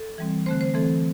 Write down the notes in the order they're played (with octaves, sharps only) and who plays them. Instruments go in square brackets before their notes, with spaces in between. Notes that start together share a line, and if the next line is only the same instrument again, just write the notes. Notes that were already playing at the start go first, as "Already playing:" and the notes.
Already playing: [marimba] A4
E3 G3 C4
D3 A3 C4 C5
C5
E3 A3 C4 A4